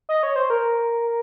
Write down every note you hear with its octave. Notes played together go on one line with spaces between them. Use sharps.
D#5
C#5
C5
A#4